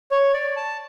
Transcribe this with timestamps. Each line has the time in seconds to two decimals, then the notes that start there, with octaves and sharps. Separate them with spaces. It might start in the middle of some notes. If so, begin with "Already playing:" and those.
0.11 C#5
0.34 D5
0.57 A5